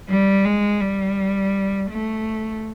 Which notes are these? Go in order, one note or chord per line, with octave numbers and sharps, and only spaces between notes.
G3
G#3
G3
A3